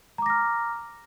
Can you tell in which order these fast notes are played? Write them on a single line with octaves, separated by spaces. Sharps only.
A#5 D6 A#6 F6